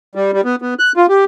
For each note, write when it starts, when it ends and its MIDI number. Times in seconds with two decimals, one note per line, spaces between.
0.15 0.31 55
0.33 0.41 55
0.45 0.56 59
0.62 0.74 59
0.79 0.92 90
0.97 1.06 65
1.09 1.25 67